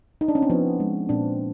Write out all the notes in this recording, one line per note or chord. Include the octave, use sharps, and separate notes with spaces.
D#4
D4
C#4
C4
F3 B3
G#3
A#2 C4 D4